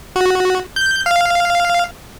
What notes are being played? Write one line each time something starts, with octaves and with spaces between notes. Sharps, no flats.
F#4
G6
F5